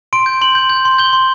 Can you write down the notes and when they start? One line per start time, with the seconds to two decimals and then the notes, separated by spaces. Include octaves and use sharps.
0.13 C6 D7
0.26 G6
0.41 C6 F#7
0.55 G6
0.70 G6
0.85 C6
0.98 G6 G7
1.13 C6